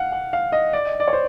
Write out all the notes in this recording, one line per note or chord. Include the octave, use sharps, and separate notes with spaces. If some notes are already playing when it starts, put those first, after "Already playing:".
Already playing: F5 F#5
F#5
F5
D#5
D5
D#5
D5
C#5
C5